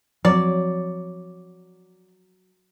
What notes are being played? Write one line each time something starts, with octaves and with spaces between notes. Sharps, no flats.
F3 F#3 C4 D5